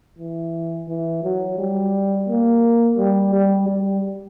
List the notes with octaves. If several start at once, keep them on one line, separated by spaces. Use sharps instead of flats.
E3
E3
F#3
G3
A#3
G3
G3
G3